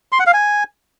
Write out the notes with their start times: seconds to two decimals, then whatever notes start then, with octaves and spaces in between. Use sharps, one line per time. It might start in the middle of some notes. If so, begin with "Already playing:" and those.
0.12 C6
0.19 F#5
0.27 F5
0.34 G#5